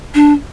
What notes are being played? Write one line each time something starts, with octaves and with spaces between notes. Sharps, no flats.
D4